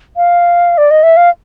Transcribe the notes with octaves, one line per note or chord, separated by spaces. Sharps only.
F5
D5
D#5
E5
F5